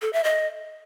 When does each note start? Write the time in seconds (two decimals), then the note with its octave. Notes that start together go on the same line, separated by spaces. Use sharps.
0.02 A4
0.13 E5
0.24 D#5